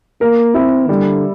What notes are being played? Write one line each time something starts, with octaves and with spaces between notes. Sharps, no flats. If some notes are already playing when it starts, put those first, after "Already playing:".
A#3 A#4
C4 E4
D3 G3